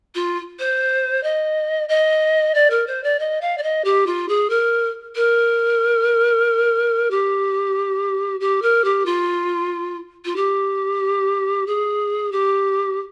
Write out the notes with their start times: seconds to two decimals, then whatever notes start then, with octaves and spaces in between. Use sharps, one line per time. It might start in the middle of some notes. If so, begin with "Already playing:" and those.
0.15 F4
0.59 C5
1.23 D#5
1.89 D#5
2.54 D5
2.70 A#4
2.87 C5
3.03 D5
3.19 D#5
3.41 F5
3.57 D5
3.63 D#5
3.84 G4
4.06 F4
4.28 G#4
4.49 A#4
5.15 A#4
7.10 G4
8.40 G4
8.62 A#4
8.84 G4
9.05 F4
10.25 F4
10.36 G4
11.66 G#4
12.32 G4